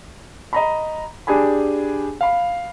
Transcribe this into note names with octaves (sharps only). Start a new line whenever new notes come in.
D#5 A#5 B5
D4 G4 G#4 G#5 B5
F5 B5